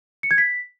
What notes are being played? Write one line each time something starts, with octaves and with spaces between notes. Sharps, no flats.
C#7
G#6
B6